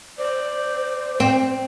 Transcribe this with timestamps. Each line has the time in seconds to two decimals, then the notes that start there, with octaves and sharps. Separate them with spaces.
0.19 C5 D5
1.20 C4